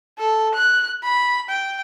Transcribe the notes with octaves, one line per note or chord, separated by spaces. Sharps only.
A4
F#6
B5
G5